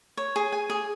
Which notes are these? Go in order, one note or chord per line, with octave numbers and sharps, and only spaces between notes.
C#5
G#4
G#5
G#4